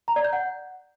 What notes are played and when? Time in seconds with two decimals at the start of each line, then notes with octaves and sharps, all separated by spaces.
0.08 A#5
0.16 D5
0.24 G6
0.33 F#5